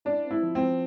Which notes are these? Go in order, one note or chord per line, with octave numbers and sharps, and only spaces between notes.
D4 E4
C4
E4
F3
C4
F3